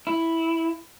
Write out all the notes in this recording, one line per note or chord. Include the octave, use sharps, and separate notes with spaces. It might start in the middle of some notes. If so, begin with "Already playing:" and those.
E4